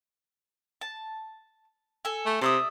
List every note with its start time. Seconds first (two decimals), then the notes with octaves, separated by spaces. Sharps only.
0.81 A5
2.05 A4 G#5
2.26 A3
2.41 C3 D5 E5 D#6